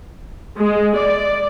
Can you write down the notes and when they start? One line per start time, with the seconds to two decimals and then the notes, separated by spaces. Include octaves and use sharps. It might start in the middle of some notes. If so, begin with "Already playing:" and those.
0.58 G#3
0.97 D5